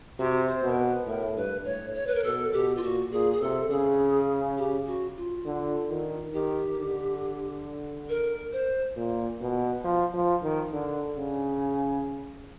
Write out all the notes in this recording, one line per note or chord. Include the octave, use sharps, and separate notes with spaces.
C3 F#4
C5
B2
A#4
B4
A2 A#4
G2 B4
A2 C#5
C#5
B4
A#4
B2 A4
B2 G4
F4
A#2 F#4
A#2 G#4
G#4
C3 A4
C#3 G#4
G4
F#4
F4
D3
D#3
D#3 G4
D3
A#4
C5
A#2
B2
F3
F3
D#3
D3
C#3